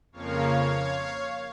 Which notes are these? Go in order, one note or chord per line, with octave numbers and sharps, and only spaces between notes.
F2 C#3 F3 A#3 C#5 F5